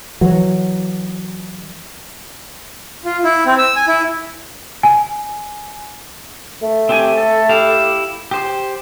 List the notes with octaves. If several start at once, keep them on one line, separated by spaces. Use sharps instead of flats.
E3 F#3
F4
E4
C4
E6
G#5
E4
G#5
A3
C4 G4 G#5
A4
E4 G4 F5
G4 C5